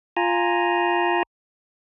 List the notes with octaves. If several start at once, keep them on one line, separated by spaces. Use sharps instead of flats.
F4 G#5 A#5